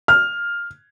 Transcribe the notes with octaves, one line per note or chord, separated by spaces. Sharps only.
F6